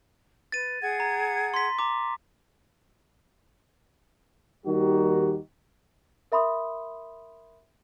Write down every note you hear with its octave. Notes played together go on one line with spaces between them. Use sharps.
B4 A6 D#7
G#4 F#5 G#6
A#5
C6 B6
A#5 D6
D#2 D#3 G3 D#4 F#4 G4
A#4 E5 B5 C6 D#6